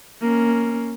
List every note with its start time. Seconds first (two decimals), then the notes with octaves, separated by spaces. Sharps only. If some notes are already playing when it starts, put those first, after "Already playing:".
0.21 A#3 C#4